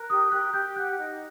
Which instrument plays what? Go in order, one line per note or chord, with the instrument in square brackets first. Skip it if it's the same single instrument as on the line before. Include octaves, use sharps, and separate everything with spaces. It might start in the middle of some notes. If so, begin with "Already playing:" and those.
Already playing: [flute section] A#4 [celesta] F#6
[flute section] G4 [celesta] D#6
[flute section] G4 [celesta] F#6
[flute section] G4 [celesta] G6
[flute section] F#5 [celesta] F#6
[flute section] D#4